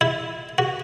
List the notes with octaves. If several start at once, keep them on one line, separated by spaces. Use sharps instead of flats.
E4
F#4